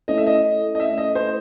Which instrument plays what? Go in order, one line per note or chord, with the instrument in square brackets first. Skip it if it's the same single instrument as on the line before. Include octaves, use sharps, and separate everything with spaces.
[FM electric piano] A3 C#4 E4 A4 [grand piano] D#5
[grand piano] E5
D#5
D#5
E5
D#5
C5